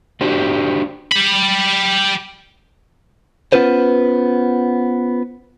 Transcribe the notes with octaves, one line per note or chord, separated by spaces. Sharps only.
D4 F#4 G4 C5 D5
G4 B5
B3 C#4 F4 B4 C5